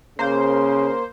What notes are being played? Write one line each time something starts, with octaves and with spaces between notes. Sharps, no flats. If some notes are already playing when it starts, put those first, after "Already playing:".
C#3 A#3 C5